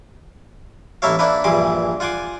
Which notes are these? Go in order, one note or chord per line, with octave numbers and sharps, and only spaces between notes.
A1 A#3 E4 A4 C#5 F5
A#3 D4 E4 B4
A#1 G2 E3 G#4 C6 D6
F4 F#5 G#5 C6 D6